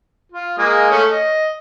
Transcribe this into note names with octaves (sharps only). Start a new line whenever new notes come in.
F4
G#3 A#3 D#6
A3 C#4
D#5